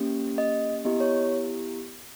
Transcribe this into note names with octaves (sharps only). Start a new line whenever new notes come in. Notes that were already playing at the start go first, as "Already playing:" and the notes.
Already playing: A#3 C#4 G4
D#5
B3 E4 G4 D#5
C#5